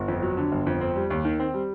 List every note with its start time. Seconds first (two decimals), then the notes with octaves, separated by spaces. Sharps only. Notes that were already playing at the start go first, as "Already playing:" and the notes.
Already playing: G1
0.08 F2
0.23 F#3
0.37 D3
0.52 G1
0.67 F2
0.81 C4
0.96 G3
1.10 D#2
1.25 D#3
1.40 C4
1.54 G3